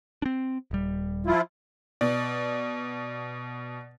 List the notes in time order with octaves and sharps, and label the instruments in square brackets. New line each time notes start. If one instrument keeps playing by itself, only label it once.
[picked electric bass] C4 D4
D#1 G3
[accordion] F3 E4 F4
[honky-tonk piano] B2 [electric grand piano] D5